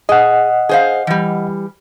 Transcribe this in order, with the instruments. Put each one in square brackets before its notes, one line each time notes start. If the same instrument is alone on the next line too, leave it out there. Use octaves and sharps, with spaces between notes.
[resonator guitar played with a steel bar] G#4 [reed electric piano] D#5 F#5
[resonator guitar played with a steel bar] G#4 C5 F5
E3 G3